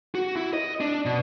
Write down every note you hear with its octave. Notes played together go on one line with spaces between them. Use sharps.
F#4
E4
D#5
D4
B2